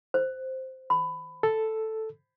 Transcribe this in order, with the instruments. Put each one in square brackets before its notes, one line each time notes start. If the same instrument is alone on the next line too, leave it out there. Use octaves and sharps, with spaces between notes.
[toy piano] C5
B5
[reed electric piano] A4